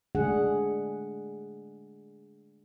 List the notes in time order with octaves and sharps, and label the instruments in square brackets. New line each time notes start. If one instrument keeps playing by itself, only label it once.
[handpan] D3 G#3 A3 D4 G#4 F#5